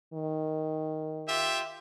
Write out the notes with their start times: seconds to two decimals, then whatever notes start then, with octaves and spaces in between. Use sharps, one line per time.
0.13 D#3
1.28 F4 G4 E5